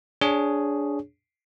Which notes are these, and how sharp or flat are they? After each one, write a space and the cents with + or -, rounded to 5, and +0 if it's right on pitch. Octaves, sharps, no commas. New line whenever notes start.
D4 -15 G#4 +0 C#5 +0